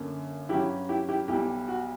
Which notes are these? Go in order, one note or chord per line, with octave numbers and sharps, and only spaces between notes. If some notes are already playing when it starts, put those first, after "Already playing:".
Already playing: F#2 D3 A#3 C#4
G2 F#3 C#4 E4 G4
E4 G4
E4 G4
B1 B2 G3 E4 G4
F#4